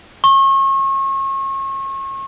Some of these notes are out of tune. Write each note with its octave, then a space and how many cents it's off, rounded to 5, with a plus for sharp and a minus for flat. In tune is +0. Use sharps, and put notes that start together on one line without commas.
C#6 -35